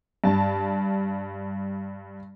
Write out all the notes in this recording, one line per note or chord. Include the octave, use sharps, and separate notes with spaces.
G2 A5